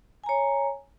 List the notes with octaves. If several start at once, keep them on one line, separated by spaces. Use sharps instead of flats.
C#5 G#5 A#5